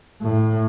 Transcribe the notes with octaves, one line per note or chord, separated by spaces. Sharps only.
A2